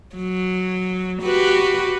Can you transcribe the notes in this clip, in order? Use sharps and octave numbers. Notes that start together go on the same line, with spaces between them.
F#3
F#4 G4 B4